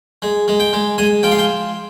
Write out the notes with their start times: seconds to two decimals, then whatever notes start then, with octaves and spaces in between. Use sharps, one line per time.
0.22 G#3
0.48 G#3
0.60 G5
0.73 G#3
0.98 G#3 G#5
1.23 F3 G5
1.31 F5
1.39 G5